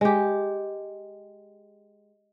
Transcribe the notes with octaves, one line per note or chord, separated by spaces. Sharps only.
G#3 G4